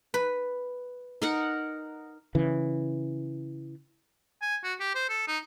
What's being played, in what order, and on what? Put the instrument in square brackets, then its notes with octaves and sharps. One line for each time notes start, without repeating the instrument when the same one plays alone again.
[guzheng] B4
[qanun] D#4 A#4 F#5
[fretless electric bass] C#3 E3
[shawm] G#5
F#4
G4
C5
A4
D#4